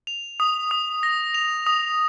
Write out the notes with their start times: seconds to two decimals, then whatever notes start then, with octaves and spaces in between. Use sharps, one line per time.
0.07 F7
0.40 D#6
0.71 D#6
1.03 A#6
1.34 F7
1.67 D#6